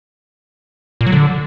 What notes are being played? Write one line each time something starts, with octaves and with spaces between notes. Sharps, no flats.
A#2
F#3
D3